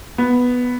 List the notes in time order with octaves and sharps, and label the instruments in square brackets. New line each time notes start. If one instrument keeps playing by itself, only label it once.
[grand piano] B3